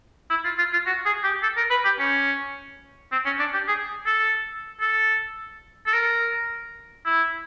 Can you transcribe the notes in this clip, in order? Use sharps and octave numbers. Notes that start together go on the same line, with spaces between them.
E4
F4
F4
F4
F#4
G#4
G4
A4
A#4
B4
G4
C#4
C4
C#4
D4
G4
G#4
A4
A4
A4
A#4
E4